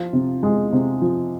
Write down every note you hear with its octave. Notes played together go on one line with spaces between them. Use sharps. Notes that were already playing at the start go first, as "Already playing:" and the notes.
Already playing: F3 F4
C3
G#3
C3
F3